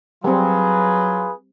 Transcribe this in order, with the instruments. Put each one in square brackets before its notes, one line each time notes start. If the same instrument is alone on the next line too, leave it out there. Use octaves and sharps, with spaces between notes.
[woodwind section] F#3 [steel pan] G3 C4 [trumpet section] F4 G#4 B4